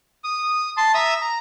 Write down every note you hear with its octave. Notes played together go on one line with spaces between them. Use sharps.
D#6
A5 C6
E5 A#5 D#6 E6
A#5